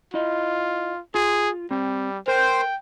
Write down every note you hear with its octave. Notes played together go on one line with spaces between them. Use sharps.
E4 F4 D#5
F4 G#4
G3 C4
A#4 C5 G5